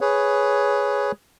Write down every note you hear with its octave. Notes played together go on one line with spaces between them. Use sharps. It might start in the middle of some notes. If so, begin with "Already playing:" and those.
G#4 B4 C#5